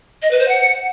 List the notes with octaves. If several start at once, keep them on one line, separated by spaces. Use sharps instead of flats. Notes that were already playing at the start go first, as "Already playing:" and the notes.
D#5
B4
C5
F#5